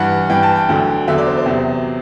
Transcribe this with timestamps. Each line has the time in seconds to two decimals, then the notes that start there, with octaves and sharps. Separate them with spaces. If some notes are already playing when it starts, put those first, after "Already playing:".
Already playing: G2 E3 F#5
0.29 G2 E3 G5
0.43 A5
0.56 G5
0.69 D2 D3 F#3
1.08 E2 D3 F#3 E5
1.18 D5
1.27 C5
1.37 C5
1.46 E2 C3 F#3